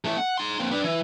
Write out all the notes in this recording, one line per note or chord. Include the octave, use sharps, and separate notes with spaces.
E3 A3
F#5
D#4 C6
A#3 C4
D4 B4
E3